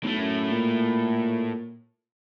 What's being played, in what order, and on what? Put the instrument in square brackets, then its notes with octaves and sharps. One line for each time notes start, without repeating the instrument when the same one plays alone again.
[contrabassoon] B1 [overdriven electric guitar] A2 A3
[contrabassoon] F#2
A#2